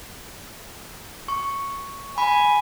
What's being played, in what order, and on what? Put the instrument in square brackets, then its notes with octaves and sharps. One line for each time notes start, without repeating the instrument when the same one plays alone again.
[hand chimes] C#6
[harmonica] G#5 [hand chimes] B5